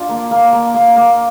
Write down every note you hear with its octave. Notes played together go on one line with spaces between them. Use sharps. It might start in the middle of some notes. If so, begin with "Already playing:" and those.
Already playing: D4 F4
A#3
A#3
A#3
A#3
A#3